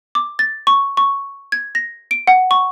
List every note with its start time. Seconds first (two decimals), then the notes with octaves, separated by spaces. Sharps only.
0.15 D6
0.39 A6
0.67 C#6
0.97 C#6
1.52 G#6
1.75 A#6
2.11 D7
2.27 F#5
2.51 C#6